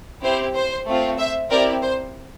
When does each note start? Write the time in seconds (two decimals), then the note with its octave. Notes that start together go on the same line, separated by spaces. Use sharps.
0.23 C4 E4 G4 C5
0.55 C5
0.87 A3 C4 F4
1.18 C5 E5
1.50 C4 E4 G4 A#4 D5
1.82 C5